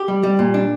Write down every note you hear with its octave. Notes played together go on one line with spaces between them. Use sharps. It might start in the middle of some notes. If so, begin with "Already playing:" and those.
Already playing: G4
G3
G3
A#2
D4